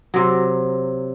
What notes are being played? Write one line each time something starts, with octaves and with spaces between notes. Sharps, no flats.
C3 F#3